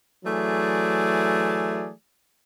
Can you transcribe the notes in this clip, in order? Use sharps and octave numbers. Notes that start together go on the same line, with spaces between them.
E3 F#3 A3 G#4 D5